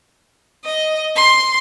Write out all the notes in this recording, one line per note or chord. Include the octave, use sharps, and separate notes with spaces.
D#5
C6